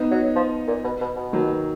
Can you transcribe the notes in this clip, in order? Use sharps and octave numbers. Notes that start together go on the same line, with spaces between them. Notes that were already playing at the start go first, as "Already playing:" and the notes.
Already playing: B3 D#4
F#3
F3
A#2
B2
B2
B2
D#3 F#3